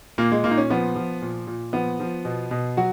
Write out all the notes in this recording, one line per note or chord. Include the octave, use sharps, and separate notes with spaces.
A#2 A#3
G#3
A#2 A#3
D#4
C#4
F3 B3
F3
A#2
A#2
F3 B3
F3
B2
B2
F#3 F#4